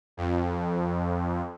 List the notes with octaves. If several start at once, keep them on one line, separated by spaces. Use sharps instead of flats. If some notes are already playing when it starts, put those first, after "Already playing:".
F2